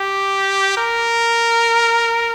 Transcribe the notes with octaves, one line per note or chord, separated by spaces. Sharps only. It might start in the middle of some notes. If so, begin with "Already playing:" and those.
Already playing: G4
A#4